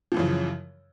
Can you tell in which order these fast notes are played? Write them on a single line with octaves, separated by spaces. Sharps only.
F3 E3 F#2 C#3